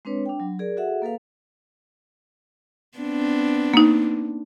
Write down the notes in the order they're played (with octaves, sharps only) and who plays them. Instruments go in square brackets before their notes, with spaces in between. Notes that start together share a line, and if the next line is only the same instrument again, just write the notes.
[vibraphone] G#3 C4 D4 B4 C#5
D4 G5
F#3
G#4 A#4 D5
F#4 G#4 A4 E5 F#5
A#3 A4 B4 F5
[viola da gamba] B3 C4 D4
[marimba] A#3 D#4